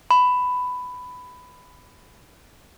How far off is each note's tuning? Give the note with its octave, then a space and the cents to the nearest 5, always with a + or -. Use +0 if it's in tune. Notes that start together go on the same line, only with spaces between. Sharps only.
B5 +15